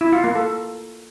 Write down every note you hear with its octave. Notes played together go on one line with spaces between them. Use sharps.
E4
F4
A#3
A4